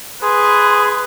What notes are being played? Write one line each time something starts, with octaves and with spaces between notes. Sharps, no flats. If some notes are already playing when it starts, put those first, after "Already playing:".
G#4 B4 C6